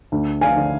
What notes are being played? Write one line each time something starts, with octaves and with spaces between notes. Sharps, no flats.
D2
F5 G#5
D3